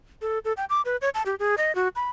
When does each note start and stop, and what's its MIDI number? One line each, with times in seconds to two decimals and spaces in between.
0.22 0.39 69
0.45 0.53 69
0.57 0.65 79
0.70 0.82 86
0.85 0.97 71
1.02 1.09 73
1.15 1.22 81
1.26 1.35 67
1.39 1.55 68
1.58 1.75 75
1.75 1.88 66
1.96 2.10 83